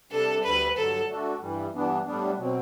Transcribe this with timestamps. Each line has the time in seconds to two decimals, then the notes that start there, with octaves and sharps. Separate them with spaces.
0.11 C3 G3 D4 A4
0.44 D2 D3 G3 B4
0.76 G2 D3 F#3 A4
1.08 D3 A3 D4 F#4 A4
1.41 G2 E3 G3
1.73 G2 E3 B3 D4
2.05 A2 G3 B3 D4
2.38 B2 F#3 C4